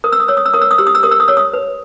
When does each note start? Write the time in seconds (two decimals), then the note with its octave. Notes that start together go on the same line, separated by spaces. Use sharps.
0.04 A#4 D#6
0.13 E6
0.20 D#6
0.28 C#5 E6
0.37 D#6
0.45 E6
0.53 A#4 D#6
0.61 E6
0.71 D#6
0.78 G4 E6
0.87 D#6
0.95 E6
1.03 A#4 D#6
1.11 E6
1.20 D#6
1.28 C#5 E6
1.37 D#6
1.53 B4